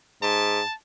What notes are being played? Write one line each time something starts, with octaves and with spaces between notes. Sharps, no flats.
G#2 A5